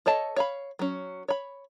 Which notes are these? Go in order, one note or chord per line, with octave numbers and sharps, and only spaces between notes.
A4 C#5 D#5 A5
C#5 F5 B5
F#3 C#4
C#5 B5